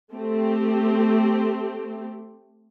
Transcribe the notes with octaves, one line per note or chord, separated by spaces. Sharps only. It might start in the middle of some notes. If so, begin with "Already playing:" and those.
A3 C4 G4